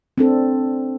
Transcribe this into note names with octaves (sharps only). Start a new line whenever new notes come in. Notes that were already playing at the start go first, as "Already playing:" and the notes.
C4 D4 A4